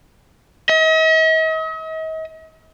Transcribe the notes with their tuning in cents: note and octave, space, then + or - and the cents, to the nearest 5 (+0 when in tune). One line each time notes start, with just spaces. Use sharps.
D#5 +45